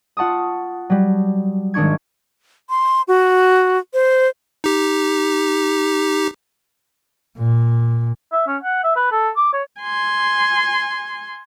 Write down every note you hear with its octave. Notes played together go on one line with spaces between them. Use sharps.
F4 F#5 A5 C#6 D#6
F#3 G3
G#1 D#3 D4 C#6 G#6
C6
F#4
C5
D#4 G4
A#2
E5
C#4
F#5
E5
B4
A4
D6
C#5
G#5 C6